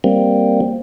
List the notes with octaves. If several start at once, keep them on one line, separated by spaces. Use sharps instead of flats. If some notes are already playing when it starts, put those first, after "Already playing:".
G3 A#3 C4